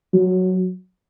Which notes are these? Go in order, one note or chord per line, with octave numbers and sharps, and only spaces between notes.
F#3